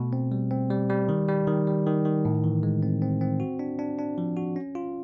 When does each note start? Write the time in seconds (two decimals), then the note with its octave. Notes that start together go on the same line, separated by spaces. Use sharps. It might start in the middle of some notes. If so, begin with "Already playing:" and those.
Already playing: B2 A3
0.13 C4
0.32 G3
0.51 C4
0.70 G3
0.90 G3
1.09 D#3
1.28 G3
1.47 D#3
1.67 G3
1.86 D#3
2.05 D#3
2.25 A2
2.44 E3
2.63 G#3
2.83 C4
3.02 C4
3.21 C4
3.40 F#4
3.59 D4
3.79 D4
3.99 D4
4.18 F3
4.37 F#4
4.56 C#4
4.75 F4